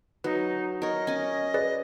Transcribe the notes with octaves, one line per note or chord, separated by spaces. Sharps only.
F#3 D#4 B4
A#4 C#5 D#5
C#4 G#5
G#4 B4 D5